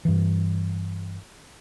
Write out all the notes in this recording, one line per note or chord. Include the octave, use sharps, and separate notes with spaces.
G2 E3